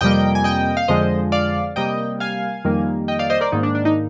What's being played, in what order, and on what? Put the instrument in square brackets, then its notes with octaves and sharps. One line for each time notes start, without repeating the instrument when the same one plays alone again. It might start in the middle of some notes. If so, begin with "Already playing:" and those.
[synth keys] F2 C3 G3 A#3 D#5 G5
G#5
D#5 G5
F5
F2 D3 F3 G#3 C5 D#5
D5 F5
C3 G3 A#3 D#5 G5
F5 G#5
F2 D#3 G3 A#3
D#5 G5
D5 F5
C5 D#5
A#4 D5
G#2 D#3 A#3 D#4
D4
D4
D#4